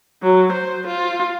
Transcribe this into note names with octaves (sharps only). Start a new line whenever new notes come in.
F#3
C5
F4